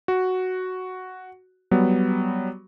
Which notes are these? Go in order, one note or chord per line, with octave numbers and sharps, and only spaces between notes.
F#4
F#3 G3 B3